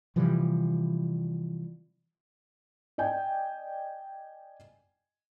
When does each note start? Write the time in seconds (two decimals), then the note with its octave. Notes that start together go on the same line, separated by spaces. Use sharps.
0.16 C3 E3 F3 G3
2.98 D5 D#5 G5 G#5